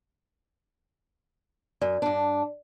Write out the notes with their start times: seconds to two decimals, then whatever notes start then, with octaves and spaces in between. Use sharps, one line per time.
1.82 F#2 D5
2.02 G2 D4